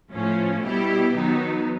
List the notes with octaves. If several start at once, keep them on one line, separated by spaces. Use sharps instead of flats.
A2 F3 A3 C#4
B2 G3 B3 E4 G4
D#3 F#3 B3 D#4